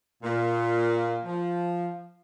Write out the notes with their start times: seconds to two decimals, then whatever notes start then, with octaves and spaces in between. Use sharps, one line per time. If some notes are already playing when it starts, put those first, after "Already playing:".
0.23 A#2
1.25 F3